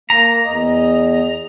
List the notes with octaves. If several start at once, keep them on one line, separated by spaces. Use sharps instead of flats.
A#3 A#5
E2 D#5